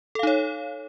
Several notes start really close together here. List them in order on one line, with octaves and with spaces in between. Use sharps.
A4 F5 D#4 C#5